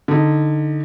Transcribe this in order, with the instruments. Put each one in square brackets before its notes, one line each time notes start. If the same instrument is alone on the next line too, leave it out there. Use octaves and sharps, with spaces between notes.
[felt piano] D3 D#4